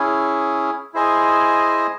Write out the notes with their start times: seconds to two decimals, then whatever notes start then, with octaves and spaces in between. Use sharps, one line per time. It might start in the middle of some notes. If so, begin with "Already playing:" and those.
Already playing: C#4 E4 G#4
0.94 E4 G#4 C5 D#5 G#5